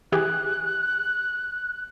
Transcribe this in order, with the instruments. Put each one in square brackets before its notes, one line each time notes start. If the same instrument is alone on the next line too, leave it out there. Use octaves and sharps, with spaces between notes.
[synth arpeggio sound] E3 G4 G#4 [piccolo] F#6